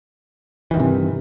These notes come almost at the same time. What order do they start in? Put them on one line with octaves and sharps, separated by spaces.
E3 D#3 G2 C3